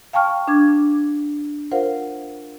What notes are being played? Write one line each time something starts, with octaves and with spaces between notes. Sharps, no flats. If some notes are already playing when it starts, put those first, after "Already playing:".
F5 G5 A5 C#6 F6
D4 D6 G#6
F4 A#4 C5 F5 F#5